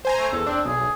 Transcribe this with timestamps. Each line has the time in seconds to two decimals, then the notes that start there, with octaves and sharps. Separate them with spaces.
0.05 C5 G#5 A#5
0.18 A3
0.32 E2 A4
0.47 C4 D4
0.65 B1 G#4